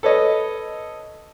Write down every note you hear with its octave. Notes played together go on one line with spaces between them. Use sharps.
A4 B4 C#5 D#5